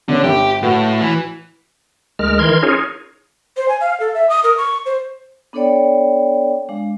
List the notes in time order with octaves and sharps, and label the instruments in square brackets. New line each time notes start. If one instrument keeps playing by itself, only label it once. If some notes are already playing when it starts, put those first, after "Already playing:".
[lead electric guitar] D3 [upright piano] B3 C#4
[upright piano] G1 [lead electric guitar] G4
[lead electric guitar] A2 [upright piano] F#4 B4
[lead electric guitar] E3
[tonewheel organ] D2 G#3 A#4 F6
D#3 E3 A#4 C6 G#6
C#4 D#4 F4 G#4 A#4 C#5
[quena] C5
G#5
F5
A4
E5
D#6
A#4
C#6
C5
[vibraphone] B3 D4 A4 C#5 D5 G5
G#3 D4 F5